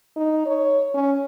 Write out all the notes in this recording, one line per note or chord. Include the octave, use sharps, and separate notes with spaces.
D#4
C#5
C#4